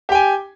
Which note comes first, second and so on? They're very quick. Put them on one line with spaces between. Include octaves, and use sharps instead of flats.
G4 G5 G#5